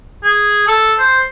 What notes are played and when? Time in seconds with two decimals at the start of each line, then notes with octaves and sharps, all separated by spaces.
0.24 G#4
0.68 A4
1.00 C5